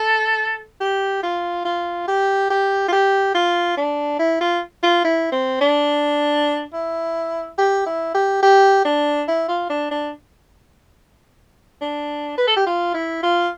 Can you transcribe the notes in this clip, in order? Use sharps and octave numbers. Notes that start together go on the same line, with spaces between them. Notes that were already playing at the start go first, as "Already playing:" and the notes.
Already playing: A4
G4
F4
F4
G4
G4
F4
G4
F4
D4
E4
F4
F4
E4
C4
D4
E4
G4
E4
G4
G4
D4
E4
F4
D4
D4
D4
B4
A4
G4
F4
E4
F4